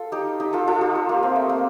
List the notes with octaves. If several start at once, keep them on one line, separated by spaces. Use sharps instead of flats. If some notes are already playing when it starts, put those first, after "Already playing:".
Already playing: F4 A4
D#4 G4
D#4 G4
F4 A4
F4 A4
D#4 G4
D#4
A#3
C4
A3
A#3